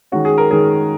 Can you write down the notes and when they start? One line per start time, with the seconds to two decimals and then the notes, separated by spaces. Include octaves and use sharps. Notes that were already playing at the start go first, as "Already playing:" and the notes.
0.12 D#3 G#3 C#4 F#4
0.25 G#4
0.38 A#4
0.50 D#3 G#3 C#4 G#4